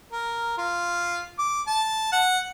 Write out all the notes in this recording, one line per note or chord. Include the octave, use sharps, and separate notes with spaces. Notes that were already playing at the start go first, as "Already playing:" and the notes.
A#4
F4
D6
A5
F#5